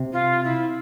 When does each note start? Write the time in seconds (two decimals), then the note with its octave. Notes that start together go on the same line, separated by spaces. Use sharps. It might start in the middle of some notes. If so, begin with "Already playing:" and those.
Already playing: C3
0.12 F4
0.44 E4